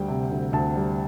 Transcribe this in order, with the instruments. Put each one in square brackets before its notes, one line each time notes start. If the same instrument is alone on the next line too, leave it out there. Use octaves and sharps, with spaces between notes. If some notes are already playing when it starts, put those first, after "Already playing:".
Already playing: [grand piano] D2 G3 G5
C3
D2
D2 A5
G3